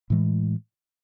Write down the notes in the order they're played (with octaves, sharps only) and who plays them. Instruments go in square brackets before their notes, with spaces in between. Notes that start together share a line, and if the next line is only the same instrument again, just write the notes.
[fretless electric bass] A2 E3 G#3